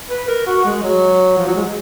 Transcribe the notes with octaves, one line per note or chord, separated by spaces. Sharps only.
B4
A#4
F#4
G#3
F#3
F3
F#3
G#3